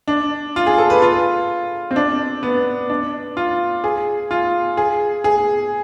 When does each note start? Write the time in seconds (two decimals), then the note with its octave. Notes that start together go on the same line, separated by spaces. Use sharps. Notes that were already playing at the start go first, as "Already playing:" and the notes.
0.08 D4
0.56 F4
0.66 G#4
0.78 A4
0.90 B4
1.02 F4
1.91 C4
1.96 D4
2.43 B3
2.90 D4
3.37 F4
3.84 G#4
4.31 F4
4.77 G#4
5.24 G#4